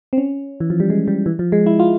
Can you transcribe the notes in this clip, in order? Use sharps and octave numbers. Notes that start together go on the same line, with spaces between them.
C4
C#4
E3
F3
G3
G#3
G3
E3
F3
G#3
E4
F4